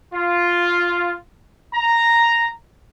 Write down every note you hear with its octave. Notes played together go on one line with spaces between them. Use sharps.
F4
A#5